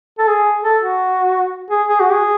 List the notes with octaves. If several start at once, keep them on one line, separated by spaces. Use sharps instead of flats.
A4
G#4
A4
F#4
G#4
G#4
F#4
G#4